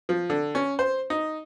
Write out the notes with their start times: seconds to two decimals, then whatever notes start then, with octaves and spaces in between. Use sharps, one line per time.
0.09 F3
0.30 D3
0.55 C#4
0.79 C5
1.10 D#4